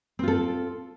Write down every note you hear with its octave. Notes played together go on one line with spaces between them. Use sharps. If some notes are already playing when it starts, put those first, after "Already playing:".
C4 F4 A4